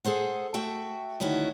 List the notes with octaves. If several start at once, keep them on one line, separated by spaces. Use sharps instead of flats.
G#4 A4 C5 F#5
A3 F#4 E5 G5
D2 D#3 C#4 E4 F#4